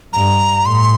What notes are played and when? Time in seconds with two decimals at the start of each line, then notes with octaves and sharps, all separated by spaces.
0.13 G2 A#5
0.65 A2 C6